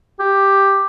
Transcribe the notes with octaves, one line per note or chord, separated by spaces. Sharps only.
G4